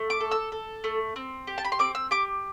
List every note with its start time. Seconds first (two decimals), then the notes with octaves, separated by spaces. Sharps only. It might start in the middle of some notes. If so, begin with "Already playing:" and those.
Already playing: A3
0.10 D6
0.20 A4
0.31 E6
0.52 A4
0.84 A3
1.16 C4
1.47 G4
1.58 A5
1.65 B5
1.72 C6
1.79 C4 D6
1.95 E6
2.11 G4 D6